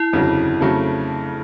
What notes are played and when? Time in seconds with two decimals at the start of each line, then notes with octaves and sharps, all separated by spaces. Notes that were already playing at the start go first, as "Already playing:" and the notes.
Already playing: E4
0.13 G1 F2 C#3 F#3
0.61 F2 C#3 F#3 A3